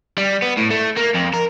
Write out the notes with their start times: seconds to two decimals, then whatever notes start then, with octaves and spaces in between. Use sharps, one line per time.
0.18 G3
0.42 B3
0.57 A2
0.71 A3
0.97 A#3
1.15 F2
1.34 A#4